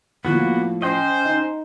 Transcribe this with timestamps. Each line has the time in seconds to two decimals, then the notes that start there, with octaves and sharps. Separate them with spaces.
0.25 A2 F3 A#3 B3 F#4
0.82 C#4 C5 D#5 G5
1.25 D#4